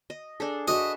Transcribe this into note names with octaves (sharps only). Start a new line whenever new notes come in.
D#5
D4 G#4 A4
F#4 B4 D#5 E5